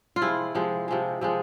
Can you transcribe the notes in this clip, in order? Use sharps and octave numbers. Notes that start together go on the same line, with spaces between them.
F4
C3 F3 G#3 E4
C3 F3 G#3
C3 F3 G#3
C3 F3 G#3